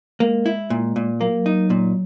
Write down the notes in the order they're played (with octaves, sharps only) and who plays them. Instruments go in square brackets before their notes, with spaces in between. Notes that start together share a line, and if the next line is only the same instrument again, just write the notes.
[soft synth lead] G#3 [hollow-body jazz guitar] A#3
[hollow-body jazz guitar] E4
A#2
A#2
[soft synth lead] F#3 [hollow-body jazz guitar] A#3
[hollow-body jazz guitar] D#4
A#2